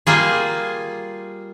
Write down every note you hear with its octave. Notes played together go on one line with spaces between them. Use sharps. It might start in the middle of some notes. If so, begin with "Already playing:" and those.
G3 A#3 F4 G#4